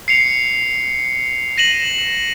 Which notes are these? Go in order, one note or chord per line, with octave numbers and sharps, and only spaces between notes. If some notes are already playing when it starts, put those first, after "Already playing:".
C7 C#7 F7
A#6 D#7 E7 F#7